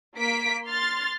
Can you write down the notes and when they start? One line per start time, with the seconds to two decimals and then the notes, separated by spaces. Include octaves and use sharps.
0.17 A#3 B6 D7
0.67 C6 F6 A6